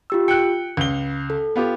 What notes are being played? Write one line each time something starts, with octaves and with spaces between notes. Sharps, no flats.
F4 G4 E6
G5 F#6 C#7
C#2 G7
A4
B3 F4 G4